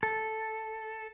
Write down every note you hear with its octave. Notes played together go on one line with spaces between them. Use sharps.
A4